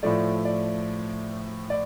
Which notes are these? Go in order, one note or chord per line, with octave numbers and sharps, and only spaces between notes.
A2 F3 A3 D5
D5
D5